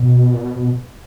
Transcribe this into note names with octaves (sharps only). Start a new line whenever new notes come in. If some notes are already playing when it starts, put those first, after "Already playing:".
Already playing: B2
A#2
B2
B2